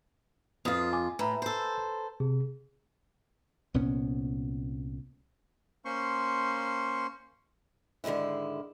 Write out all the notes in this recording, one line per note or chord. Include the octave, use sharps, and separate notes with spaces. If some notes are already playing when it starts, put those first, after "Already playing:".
F2 F4 B4 D#6
G#5 D6
A2 B4 A#5 B5
A4 C5
C3 G#4
C2 A#2 B3 C#4
A#3 C#4 C5 C6 C#6
G#2 D3 D#3 G#3 E4